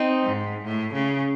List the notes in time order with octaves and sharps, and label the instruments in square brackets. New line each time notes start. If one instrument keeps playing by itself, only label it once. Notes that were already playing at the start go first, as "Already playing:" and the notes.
Already playing: [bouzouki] C4 D#4
[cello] G#2
A2
C#3